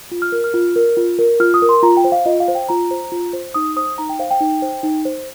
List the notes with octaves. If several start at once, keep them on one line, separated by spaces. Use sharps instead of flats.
F4
F6
A#4
F6
F4
A#4
F4
A#4
F4 F6
D#6
A#4
C6
F4 A#5
G5
C5
F5
F4 D#5
F5
C5
G5
F4 A#5
C5
F4
C5
D#4 D#6
C5 D#6
D#4 A#5
G5
C5 F5
G5
D#4
C5
D#4
C5